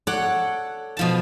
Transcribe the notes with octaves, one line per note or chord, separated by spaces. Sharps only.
A4 C#5 D5 F#5
B2 F3 A5